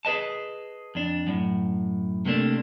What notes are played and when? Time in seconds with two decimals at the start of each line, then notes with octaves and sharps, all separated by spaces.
0.05 G#4 B4 D#5 A5
0.95 F2 D4
1.27 F#2 A2
2.25 C3 A3 A#3 D4